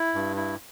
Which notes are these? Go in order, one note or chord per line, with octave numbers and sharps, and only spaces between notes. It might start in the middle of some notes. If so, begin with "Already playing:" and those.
Already playing: E4
G2
E4